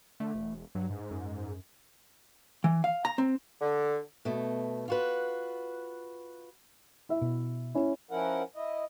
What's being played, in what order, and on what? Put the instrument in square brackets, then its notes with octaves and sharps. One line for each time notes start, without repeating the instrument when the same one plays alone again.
[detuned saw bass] D3 [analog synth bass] A3
[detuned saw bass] E1
[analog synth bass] G2 [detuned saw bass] F#3
[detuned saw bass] G#2
[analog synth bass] F#2
[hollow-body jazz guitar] E3
F5
A#5
C4
[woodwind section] D3
[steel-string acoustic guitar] B2 A3
F4 F#4 B4
[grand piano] E4 E5
[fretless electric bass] B2
[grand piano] C#4 E4
[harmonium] F3 C#4 E4 A#4 F#5
E4 D#5